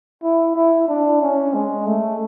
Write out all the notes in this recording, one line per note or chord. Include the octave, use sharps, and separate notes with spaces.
E4
E4
D4
C#4
G#3
A3